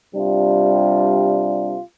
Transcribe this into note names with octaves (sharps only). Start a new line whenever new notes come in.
C3 G3 D4 F4